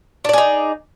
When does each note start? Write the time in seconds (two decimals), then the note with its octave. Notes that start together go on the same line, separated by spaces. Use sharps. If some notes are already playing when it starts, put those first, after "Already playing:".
0.25 D4
0.29 D5
0.33 G#4
0.38 D#4